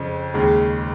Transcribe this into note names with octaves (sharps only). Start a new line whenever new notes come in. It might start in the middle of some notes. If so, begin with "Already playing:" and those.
Already playing: F2 C#3
D#2 C#3 G#3